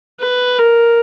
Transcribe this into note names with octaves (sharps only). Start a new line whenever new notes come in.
B4
A#4